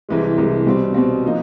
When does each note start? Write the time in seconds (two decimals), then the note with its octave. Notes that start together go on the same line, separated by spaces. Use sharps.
0.09 C2 C3 E3 G#3
0.38 C2 C3 E3 G#3
0.66 B2 G3 C4
0.94 B2 G3 C4
1.25 F3 A#3 D#4